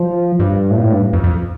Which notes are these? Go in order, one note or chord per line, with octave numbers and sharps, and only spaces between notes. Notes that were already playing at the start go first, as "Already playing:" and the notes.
Already playing: F3
G2
A2
A#2
A2
G2
F2
F2